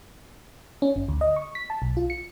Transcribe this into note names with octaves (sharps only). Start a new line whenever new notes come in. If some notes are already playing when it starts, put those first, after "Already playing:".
C#4
G1
D2
D#5
C#6
B6
A5
B1
F4
C#7